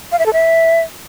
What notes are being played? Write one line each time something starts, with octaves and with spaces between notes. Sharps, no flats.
F5
E5
A4
E5